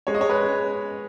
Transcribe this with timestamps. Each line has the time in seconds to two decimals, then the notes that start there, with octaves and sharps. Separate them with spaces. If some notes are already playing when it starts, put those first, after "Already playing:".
0.07 G#3 C#5
0.15 D#5
0.21 C#5
0.29 G#3 B4